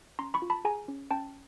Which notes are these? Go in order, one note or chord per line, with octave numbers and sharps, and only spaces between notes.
C#4 A#5 C6
B5 C#6
F4
A5 B5
G#4 G#5 A#5
C#4
C#4 G5 A5